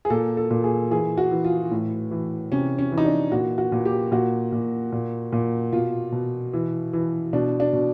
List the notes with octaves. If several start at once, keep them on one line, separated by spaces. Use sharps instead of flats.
G#4
A#2 A4
A4
A#2
G#4
E3 G#4
F#4
E3
F4
A2
E3
C3 C#4
C#4
E3
D#4
D4
A#2 F#4
F#4
A#2
G4
A#2 F#4
A#2
A#2
A#2
B2 F4
B2
E3
E3
B2 D4
D4
B2